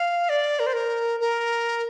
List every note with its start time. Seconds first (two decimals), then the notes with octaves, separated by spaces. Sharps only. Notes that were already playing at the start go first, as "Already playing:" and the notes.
Already playing: F5
0.29 D5
0.59 A#4
0.67 C5
0.73 A#4
1.20 A#4